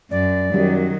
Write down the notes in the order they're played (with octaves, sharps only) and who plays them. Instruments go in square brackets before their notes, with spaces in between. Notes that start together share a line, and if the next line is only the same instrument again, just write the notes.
[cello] F#2 [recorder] D5
[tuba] F#2 [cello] D#3 F#3 [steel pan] G3